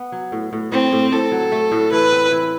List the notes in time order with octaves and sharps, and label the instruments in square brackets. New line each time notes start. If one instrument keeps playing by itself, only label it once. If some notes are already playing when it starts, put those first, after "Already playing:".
Already playing: [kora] B3
F#3
A2
A2
[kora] A2 [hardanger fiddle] C4
[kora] A2
[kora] A2 [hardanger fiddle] A4
[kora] F#3
A3
A2
[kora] E3 [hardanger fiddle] B4
[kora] C4
E3